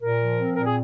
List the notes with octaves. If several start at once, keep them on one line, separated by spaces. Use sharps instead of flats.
A#2 A#4
F3
C4
A#2 A#4
G#4